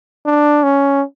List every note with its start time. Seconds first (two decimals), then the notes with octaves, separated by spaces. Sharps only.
0.26 D4
0.63 C#4